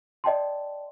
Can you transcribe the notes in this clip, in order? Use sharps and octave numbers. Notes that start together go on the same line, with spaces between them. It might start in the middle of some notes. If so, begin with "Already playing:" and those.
D5 D#5 G5 A5 C6